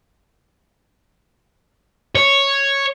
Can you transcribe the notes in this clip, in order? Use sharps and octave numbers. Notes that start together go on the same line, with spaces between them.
C#5